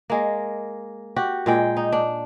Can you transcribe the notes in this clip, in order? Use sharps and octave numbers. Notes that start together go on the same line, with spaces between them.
G#3 A#3
F#4 G4
A#2 G#3 G5
D#4
D4